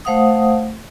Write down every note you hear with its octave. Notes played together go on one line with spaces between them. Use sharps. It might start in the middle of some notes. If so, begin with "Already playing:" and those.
A3 C5 F5 F#5 D#6